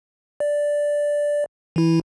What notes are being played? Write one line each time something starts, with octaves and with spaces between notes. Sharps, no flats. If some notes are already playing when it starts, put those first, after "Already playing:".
D5
E3 E4